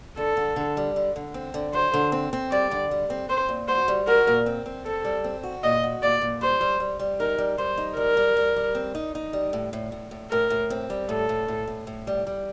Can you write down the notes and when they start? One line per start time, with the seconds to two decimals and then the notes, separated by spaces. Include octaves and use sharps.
0.17 D3 A4
0.37 D3
0.56 D3
0.77 G3
0.96 D3
1.16 D3
1.34 C4
1.54 D3
1.73 F#2 C5
1.94 D3
2.12 C4
2.33 C4
2.51 G3 D5
2.71 D3
2.91 G3
3.10 C4
3.29 C4 C5
3.49 A#2
3.68 F#4 C5
3.88 G3
4.07 F#4 A#4
4.27 A#2
4.46 C4
4.66 C4
4.85 C4 A4
5.04 G3
5.24 C4
5.43 F#4
5.63 A#2 D#5
5.84 F#4
6.03 A#2 D5
6.21 A#2
6.41 G3 C5
6.61 G3
6.80 G3
6.99 G3
7.20 D#4 A#4
7.38 G3
7.58 G3 C5
7.77 D#4
7.97 G3 A#4
8.17 G3
8.37 G3
8.56 G3
8.75 C4
8.95 D#4
9.15 D#4
9.33 G3
9.53 A2
9.73 A2
9.92 A2
10.11 A2
10.31 A2 A#4
10.50 A2
10.70 C4
10.90 G3
11.09 A2 A4
11.29 A2
11.48 A2
11.67 A2
11.87 A2
12.07 G3
12.27 G3